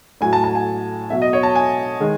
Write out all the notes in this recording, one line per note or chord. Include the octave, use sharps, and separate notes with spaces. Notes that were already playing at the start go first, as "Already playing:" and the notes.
A2 F#3 G#5
A5
A5
G#5
B2 F#3 E5
D#5
C#5
A5
G#5
D#3 G#3